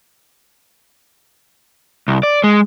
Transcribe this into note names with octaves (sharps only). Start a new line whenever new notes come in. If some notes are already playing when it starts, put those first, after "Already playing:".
C2
D5
G#3